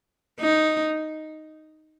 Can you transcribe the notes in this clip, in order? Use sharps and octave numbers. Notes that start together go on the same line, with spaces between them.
D#4